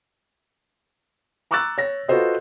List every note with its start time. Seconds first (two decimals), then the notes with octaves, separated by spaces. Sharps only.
1.51 A#5 C#6 D6 E6 F#6 A6
1.78 C#5 A#6
2.08 F4 F#4 A4 B4 C5 D#5